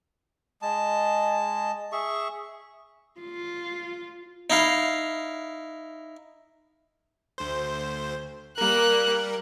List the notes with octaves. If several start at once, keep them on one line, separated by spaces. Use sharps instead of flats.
G#3 A5
G#4 E5 C#6
F4
D#4 E4 F5
D2 C5
G3 A#3 A#4 F#6